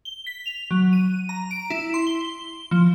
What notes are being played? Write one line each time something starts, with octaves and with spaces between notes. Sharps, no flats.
G7
B6
F7
F#3
D#7
A#5
D7
E4
C6
G7
F3